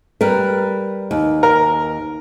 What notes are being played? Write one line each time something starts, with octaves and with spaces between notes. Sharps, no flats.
G3 A#4 B4
D#2
A#4